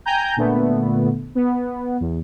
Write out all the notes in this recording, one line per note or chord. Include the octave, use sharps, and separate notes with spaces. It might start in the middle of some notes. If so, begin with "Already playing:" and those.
G5 G#5 A#5 G6
A#2 D3 A3 B3
B3
E2